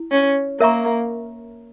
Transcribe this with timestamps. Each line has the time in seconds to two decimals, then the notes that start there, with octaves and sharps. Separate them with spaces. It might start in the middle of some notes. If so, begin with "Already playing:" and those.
Already playing: E4
0.12 C#4
0.60 A#3 A#4 E5 A#5 C#6